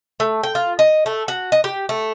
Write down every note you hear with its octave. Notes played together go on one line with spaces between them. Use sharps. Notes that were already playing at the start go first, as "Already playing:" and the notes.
A3
G5
F4
D#5
A3
F#4
D#5
G4
A3